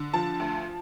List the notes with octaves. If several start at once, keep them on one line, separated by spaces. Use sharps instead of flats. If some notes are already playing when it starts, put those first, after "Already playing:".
Already playing: D3
F3 A5
D2